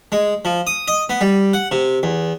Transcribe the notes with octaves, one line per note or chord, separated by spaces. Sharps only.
G#3
F3
D#6
D#5
B3
G3
F#5
C3
E2